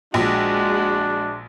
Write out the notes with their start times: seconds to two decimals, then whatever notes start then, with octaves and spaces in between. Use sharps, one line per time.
0.14 A#1 G#3 D4 F#4